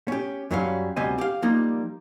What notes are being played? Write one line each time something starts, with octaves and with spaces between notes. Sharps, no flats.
C#4 G4
F#2 F#3 G3 C#4 F#4 F5
D2 C3 G3 C4 D#5 G#5
G4 F5
F3 G3 A#3 D#4